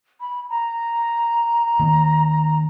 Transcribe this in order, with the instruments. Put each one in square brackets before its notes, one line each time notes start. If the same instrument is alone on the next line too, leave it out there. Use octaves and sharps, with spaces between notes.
[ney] B5
A#5
[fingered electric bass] D#3 A#3